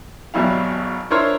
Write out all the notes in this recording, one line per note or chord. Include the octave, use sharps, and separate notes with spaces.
G#1 B2 F#3 G3 E4 F5
D4 E4 F4 A#4 C5 C#5